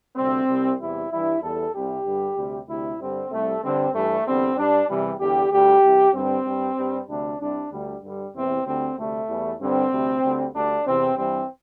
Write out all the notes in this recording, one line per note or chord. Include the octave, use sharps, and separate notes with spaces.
D2 C3 G3 C4
C2 C3 G3
E2 C3 E3 G3 E4
G2 E3 G3 E4
E2 E3 G3 A4
C2 C3 G3 G4
G2 D3 G3
D2 C3 G3
D2 C3 G3 E4
G2 D3 G3 C4
C2 C3 G3 A3
G2 D3 G3 C4
G2 E3 G3 A3
E2 D3 G3 C4
G2 G3 D4
E2 C3 E3 G3
E2 D3 G3 G4
D2 D3 G3 G4
C2 C3 E3
G2 D3 G3 C4
G2 G3
G2 G3
D2 C3 G3 D4
C2 C3 G3 D4
D2 D3 G3
G2 D3 G3
E2 C3 E3 G3 C4
D2 D3 G3 C4
D2 C3 G3 A3
E2 E3 G3
G2 D3 G3 C4
D2 C3 G3
D2 D3 G3
D2 D3 G3 D4
E2 C3 E3 C4
G2 E3 G3 C4